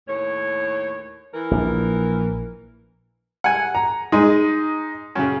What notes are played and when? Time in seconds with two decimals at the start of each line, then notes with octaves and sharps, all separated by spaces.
0.08 D#2 A2 C#5
1.34 E3 A#4
1.51 A#1
3.44 F#5 G#5
3.75 A#5
4.12 G#3 D#4
5.15 F#2 C#3